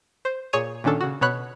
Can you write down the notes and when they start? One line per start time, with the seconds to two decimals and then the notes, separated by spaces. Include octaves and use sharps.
0.25 C5
0.53 A#2 G#4 C#5 D#7
0.84 A#2 D#3 C#4 D4 A4
1.01 C#3 F#4
1.21 B2 B3 C#5 B5 F#6